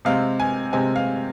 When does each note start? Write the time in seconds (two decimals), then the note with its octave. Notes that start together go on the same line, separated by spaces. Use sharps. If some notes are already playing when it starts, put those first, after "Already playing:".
0.05 C3 G#3 C4 F5
0.40 G#5
0.73 C3 G#3 C4 G#5
0.96 F5